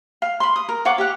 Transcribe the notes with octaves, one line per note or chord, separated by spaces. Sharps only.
F5
B5 C6
D#6
A#4
F4 C#5 F#5 D6
G4 F5 F#5